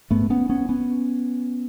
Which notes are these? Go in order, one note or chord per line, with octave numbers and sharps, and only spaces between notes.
G#2 A3 B3
B3 C#4
B3 C#4
B3 C#4